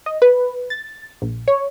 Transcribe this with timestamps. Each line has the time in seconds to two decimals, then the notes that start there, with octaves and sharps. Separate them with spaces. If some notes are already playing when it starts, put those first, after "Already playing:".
0.06 D#5
0.22 B4
0.70 A6
1.22 A#1
1.48 C#5